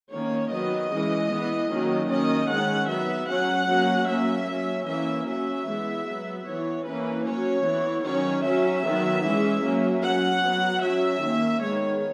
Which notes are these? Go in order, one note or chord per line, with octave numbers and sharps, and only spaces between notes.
D#3 A#3 C#4 C#5
D#3 F#3 B3 D#5
E3 G#3 C#4
E3 B3
D#3 F#3 A#3 C#4
D#3 A#3 C#4 D#5
D#3 G#3 C#4 F#5
F#3 B3 E5
F#3 C#4 F#5
F#3 A#3 C#4
F#3 A#3 C#4 E5
F#3 C#4
E3 A#3 C#4 E5
F#3 C#4 E5
E3 G#3 B3
F#3 B3
E3 B3 C#5
E3 A#3 C#4 B4
F#3 C#4 C#5
E3 B3
D#3 F#3 C#4 C#5
F#3 C#4 E5
D#3 F#3 B3
E3 G#3 C#4
F#3 A#3 C#4
F#3 C#4 F#5
F#3 B3
F#3 C#4 E5
D#3 A#3 C#4
D#3 G#3 B3 C#5